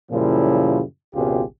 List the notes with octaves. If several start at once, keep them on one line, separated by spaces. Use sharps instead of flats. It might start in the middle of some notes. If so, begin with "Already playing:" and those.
F#2 A#2 C#3 F3 G3 E4
G#1 C#2 B2 F4 G4 G#4